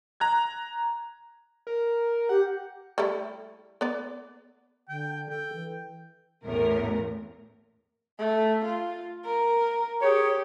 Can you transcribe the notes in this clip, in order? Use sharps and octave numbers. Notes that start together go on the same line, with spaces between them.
A#5 F#6 G#6
A#4
G4 F#5
G3 A3 E4
B3 D5
D3 G5
A4 G5
E3
A1 E2 A2 A#4
A3
F4
A#4
G4 G#4 C#5